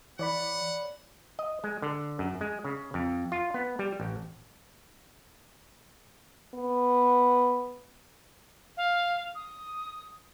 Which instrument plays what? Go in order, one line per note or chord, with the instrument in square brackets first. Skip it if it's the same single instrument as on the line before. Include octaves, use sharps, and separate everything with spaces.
[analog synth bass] E3 [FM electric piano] C#5 D5 B5 [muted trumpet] F#5
[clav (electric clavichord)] D#5
G#3
D3
F#2
G#3
C#3
F2
F4
B3
G3
A1
[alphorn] B3
[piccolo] F5
D#6